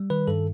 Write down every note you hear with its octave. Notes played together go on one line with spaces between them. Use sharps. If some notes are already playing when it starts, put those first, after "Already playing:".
Already playing: G3
D#3 B4
G2 A4